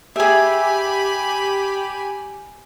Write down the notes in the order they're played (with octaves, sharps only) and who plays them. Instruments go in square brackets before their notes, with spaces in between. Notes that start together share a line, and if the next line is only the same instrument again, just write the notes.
[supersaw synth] G4 [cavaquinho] G#4 E5 [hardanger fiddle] G#5 B5